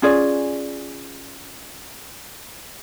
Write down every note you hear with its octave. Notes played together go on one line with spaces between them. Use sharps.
C#4 F4 G#4 D5